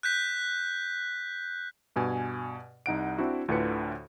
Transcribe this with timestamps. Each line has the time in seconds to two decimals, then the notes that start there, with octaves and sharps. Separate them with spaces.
0.03 F#6 G6 B6
1.96 G2 B2 G#5
2.86 C2 D#4 F#5 D7
3.18 C4 D4 E4 F#4
3.48 D2 A2 D3 F4 B4 C#7